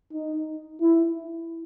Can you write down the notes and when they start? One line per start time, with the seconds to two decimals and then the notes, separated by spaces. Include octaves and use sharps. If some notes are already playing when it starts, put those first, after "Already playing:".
0.13 D#4
0.81 E4